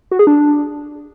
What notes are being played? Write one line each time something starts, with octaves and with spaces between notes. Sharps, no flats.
F#4
G#4
D4